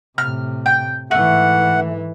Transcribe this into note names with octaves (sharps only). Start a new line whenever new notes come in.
A2 C3 F6
G5
G#2 E3 A3 F#5